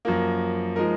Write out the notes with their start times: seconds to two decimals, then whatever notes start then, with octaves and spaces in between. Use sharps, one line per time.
0.05 F#2 F3 A#3
0.76 F3 G#3 D#4 A#4